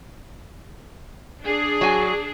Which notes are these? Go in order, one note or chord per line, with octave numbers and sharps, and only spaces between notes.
D4 G#4
F#3 G#5